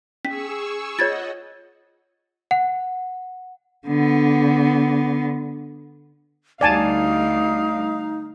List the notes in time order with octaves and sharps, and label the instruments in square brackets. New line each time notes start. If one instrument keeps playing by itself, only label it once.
[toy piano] C#4 [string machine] G#4 C#6 E6 [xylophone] B6
[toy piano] F4 C#5 [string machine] D#5 F#5 [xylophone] G#6 A6
[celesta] F#5
[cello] D3 B3
[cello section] D2 G3 [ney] D#4 [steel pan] D5 G#5 A5 [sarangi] F5